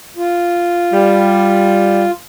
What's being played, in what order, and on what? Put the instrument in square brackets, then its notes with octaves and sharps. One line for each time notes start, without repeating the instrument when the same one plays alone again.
[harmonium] F4
[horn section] G3